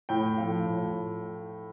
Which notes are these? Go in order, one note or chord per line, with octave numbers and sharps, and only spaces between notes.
A2 G5
F3 A3 F5
A2